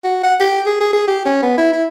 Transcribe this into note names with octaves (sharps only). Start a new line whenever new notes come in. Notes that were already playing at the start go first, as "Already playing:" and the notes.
F#4
F#5
G4
G#4
G#4
G#4
G4
C#4
B3
E4
E4